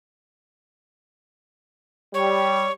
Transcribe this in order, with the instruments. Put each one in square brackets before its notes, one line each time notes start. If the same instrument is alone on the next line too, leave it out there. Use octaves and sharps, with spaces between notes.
[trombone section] G3 [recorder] C#5